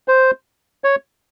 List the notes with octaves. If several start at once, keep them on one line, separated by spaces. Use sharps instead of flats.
C5
C#5